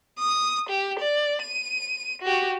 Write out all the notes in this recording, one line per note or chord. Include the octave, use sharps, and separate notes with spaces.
D#6
G4
D5
D#7
F#4 G4